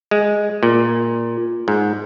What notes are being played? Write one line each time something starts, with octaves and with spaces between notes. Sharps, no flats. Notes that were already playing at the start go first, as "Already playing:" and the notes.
G#3
A#2
G#2